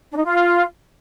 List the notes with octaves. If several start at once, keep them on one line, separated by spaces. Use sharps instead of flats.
D4
D#4
F4